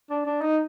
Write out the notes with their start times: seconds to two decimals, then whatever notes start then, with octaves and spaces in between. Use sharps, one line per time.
0.10 D4
0.26 D4
0.42 D#4